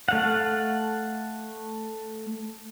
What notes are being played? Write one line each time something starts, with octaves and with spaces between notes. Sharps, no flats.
A3 F5 F#5